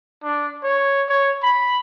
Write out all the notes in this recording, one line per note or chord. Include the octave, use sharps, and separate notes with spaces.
D4
C#5
C#5
B5